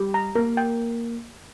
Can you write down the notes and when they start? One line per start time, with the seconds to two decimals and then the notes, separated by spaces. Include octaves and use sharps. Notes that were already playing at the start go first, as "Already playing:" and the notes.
Already playing: G3 G4
0.14 A#5
0.35 A#3 A#4
0.57 G5